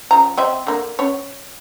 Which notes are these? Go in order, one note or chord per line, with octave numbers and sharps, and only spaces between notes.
C#3 F3 A#5
C4 D#5 E5
D3 A#3
C#4 C#5